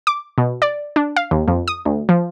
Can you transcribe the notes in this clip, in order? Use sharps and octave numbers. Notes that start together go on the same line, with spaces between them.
D6
B2
D5
D4
F5
D#2
F2
D#6
D2
F3